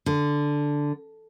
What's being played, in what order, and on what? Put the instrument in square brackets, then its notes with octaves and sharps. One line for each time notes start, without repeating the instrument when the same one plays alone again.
[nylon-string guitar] D3